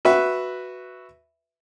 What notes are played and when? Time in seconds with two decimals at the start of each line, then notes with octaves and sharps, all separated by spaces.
0.05 F#4 B4 E5